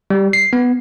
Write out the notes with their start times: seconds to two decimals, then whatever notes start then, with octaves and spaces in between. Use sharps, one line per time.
0.10 G3
0.33 C7
0.53 B3